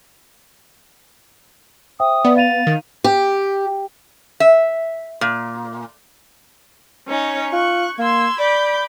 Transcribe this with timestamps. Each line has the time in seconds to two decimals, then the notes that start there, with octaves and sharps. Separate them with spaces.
2.00 C5 E5 G5 D#6
2.25 B3 D5 E5 F#5
2.37 F5 A6 D#7 F7
2.67 D#3
3.04 G4
4.40 E5
5.21 A#2
7.07 C#4 D#4 C#5
7.53 F4 C#6 F#6
7.99 A#3 C6 E6 G#6
8.39 D5 B5 D6 G6